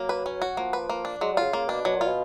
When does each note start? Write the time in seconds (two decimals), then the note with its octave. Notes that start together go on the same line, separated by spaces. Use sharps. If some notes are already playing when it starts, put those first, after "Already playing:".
Already playing: F#3 A#3
0.09 B4
0.26 C#4
0.42 F#4
0.57 F3 A#3
0.73 B4
0.89 A#3
1.05 D4
1.21 F#3 G#3
1.32 G3
1.37 C#3 F4
1.53 C#3 A#3
1.69 B2 D4
1.85 B2 F#3
1.96 A#2
2.01 F4
2.06 B2